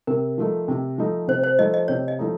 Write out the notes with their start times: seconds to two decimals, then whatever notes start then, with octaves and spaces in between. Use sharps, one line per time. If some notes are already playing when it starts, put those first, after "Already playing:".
0.07 C3 A#4
0.38 F3 A3 D#4
0.68 C3
0.98 F3 A3 D#4
1.28 C3 C5
1.44 C5
1.59 F3 A3 D#4 D#5
1.74 D#5
1.88 C3 C#5
2.08 D#5
2.19 F3 A3 D#4